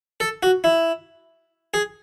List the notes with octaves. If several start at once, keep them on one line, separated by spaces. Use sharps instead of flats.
A4
F#4
E4
G#4